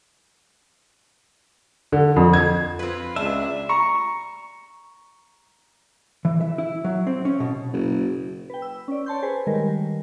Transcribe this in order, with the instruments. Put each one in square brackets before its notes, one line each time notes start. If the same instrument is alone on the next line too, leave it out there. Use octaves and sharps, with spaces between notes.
[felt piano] D3
F2
G#6
[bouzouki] C4 B4 [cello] F4
[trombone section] C#2 [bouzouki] D4 [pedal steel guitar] E5
[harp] A#5 C#6
[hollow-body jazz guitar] E3
E5
E4
F#3
C4
C#4
B2
[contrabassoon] F#1
[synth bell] B4 G5
E6
C#4 D5
C#5 A5 C6 G6
G#4 B4 C5 G#5
D#3 G3 G#3 A#4